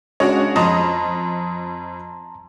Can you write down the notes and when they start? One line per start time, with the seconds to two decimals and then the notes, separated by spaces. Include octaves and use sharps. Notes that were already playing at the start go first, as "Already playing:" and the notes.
0.20 G#3 C#4 D4 F#4 C#5 D#5
0.56 F2 D#5 A5 A#5 C6 D#6